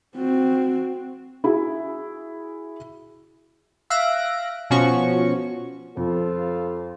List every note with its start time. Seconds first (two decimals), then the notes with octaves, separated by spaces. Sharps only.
0.17 C4 F#4
1.44 E4 F#4 G#4 E5
3.90 E5 F5 F#6 A#6 D7
4.70 B2 F3 C#4 F#4 C#6
5.97 F2 F4 A4 C5